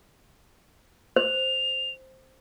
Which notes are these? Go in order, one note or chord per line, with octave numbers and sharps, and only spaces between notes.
C5 F7